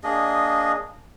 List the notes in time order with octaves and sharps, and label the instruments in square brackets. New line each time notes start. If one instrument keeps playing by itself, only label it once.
[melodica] A#3 D4 G#4 D#5